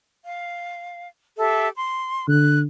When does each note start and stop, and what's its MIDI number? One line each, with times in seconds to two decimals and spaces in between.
0.25 1.07 77
1.38 1.68 67
1.38 1.68 69
1.38 1.68 76
1.76 2.25 84
2.28 2.66 50
2.28 2.59 90